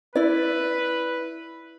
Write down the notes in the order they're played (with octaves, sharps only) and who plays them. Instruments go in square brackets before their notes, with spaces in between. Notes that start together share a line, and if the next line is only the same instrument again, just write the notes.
[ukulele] E4 D5 [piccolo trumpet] B4